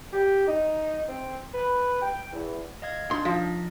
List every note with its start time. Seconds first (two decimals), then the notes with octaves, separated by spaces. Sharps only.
0.13 G4
0.47 D#4
1.09 C4
1.54 B4
2.02 G5
2.33 E2
2.82 D#5 F5 G#6
3.11 D4 D#4 C6
3.25 F3 D#4 A#6 B6